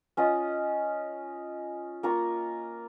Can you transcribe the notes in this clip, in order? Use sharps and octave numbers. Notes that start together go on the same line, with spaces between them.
C#4 F4 D#5
A#3 F4 A#4 C#6